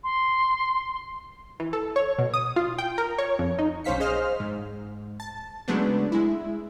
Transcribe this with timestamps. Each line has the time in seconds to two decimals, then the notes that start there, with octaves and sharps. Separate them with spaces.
0.04 C6
1.60 E3
1.73 A4
1.96 C#5
2.18 B2
2.34 D#6
2.56 F4
2.78 G5
2.98 A#4
3.18 C#5
3.39 F2
3.59 D#4
3.84 B1 C#4 C5 F5 B6 C#7
4.00 G#4 C5 D#5 F5 F6
4.40 G#2
5.20 A5
5.68 C#3 F#3 G#3 A3 B3 D4
6.12 G#3 E4